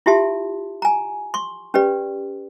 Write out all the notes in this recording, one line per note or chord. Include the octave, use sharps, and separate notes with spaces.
E4 F4 G4 E5 A5 C6
G#5 A#5
C6 C#6
C#4 G4 B4 D5